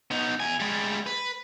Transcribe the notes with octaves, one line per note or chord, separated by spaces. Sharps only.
B3 D#4
E2 G#5
G3 G#3
B4